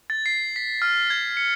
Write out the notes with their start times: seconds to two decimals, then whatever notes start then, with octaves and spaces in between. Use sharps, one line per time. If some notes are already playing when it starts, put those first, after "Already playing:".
0.10 A6
0.26 C7
0.56 B6
0.82 F6
1.10 G#6
1.37 C#7